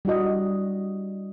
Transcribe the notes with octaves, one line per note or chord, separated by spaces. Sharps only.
G3 E4 F#4 D#5